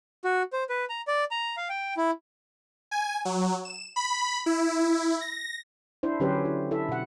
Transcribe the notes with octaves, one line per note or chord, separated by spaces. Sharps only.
F#4
C5
B4
A#5
D5
A#5
F5
G5
E4
G#5
F#3
E7
B5
E4
E4
A#6
D4 E4 C5
D3 F#3 C#4 G4 B4 C5
E4
E4 A4 E5
B2 F#5